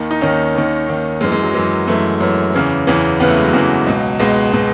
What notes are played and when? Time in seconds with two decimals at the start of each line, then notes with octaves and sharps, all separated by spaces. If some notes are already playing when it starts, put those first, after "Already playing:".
Already playing: D#2 D#3
0.11 D#4
0.21 D#2 D#3 C#4
0.55 D#2 D#3
0.88 D#2 D#3
1.21 F#2 E3 G#3
1.32 G#3
1.43 F#3
1.54 F#2 E3 G#3
1.87 F#2 E3 A3
2.21 F#2 E3 C#4
2.54 E2 C#3 E3
2.87 E2 C#3 E3
3.20 E2 C#3 E3 B3
3.28 A3
3.36 G#3
3.45 F#3
3.53 E2 C#3 E3
3.87 C#2 B2
4.20 C#2 B2 G#3
4.53 B2